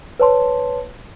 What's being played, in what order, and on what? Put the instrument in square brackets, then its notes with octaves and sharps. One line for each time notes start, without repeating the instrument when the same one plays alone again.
[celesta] B4 C#5 A5 C6